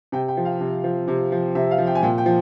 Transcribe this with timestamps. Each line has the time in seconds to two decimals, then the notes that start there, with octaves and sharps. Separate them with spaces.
0.12 C3 G5
0.28 G5
0.37 F3
0.45 F5
0.61 C3
0.84 F3
1.08 C3
1.32 F3
1.55 C3 E5
1.71 F5
1.78 F3
1.87 G5
1.95 G#5
2.03 A#2 G5
2.18 G5
2.26 F3